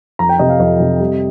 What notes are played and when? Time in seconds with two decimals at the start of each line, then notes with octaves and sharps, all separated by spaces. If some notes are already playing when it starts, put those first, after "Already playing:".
0.19 F2 A#5
0.29 G5
0.39 C3 D#5
0.49 F5
0.60 F2 D#5
0.80 C3
1.00 G3